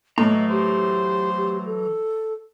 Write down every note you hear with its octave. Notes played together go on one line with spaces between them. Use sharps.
A2 E3 F#3 D#5 A#5
G4 C5
G4
A4